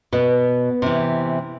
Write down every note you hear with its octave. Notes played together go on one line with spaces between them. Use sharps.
B2 B3
C3 E3